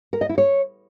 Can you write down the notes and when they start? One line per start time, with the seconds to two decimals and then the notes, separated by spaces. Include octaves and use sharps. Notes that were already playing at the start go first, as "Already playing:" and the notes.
0.13 A#4
0.21 D#5
0.29 E4
0.38 C#5